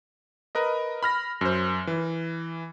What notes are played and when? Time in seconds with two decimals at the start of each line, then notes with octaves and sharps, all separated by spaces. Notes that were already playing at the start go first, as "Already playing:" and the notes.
0.55 A#4 B4 D#5
1.03 B5 F6 A#6
1.41 F#2 C5
1.87 E3